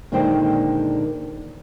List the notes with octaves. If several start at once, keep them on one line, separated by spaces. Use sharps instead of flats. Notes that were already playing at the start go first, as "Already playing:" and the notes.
A#2 D3 D#3 G#3 C5 G5